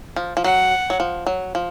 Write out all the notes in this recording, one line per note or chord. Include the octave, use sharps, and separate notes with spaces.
F3
F3
F#3 F#5
F#3
F3
F#3
F3